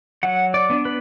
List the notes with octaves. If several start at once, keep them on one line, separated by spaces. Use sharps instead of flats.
F#3 F#5
D5
B3 D4
B4